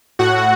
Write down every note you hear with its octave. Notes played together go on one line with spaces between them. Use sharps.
A2 F#4 F#5